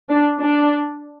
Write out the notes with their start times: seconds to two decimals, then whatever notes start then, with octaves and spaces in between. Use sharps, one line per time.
0.09 D4
0.39 D4